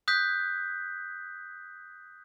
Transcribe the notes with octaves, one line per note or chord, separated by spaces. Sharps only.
D#6 F#6 G6 B6